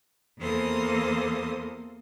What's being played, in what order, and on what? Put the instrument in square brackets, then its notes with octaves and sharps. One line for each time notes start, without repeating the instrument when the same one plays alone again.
[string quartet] E2 E3 A#3 A4 C5 D#6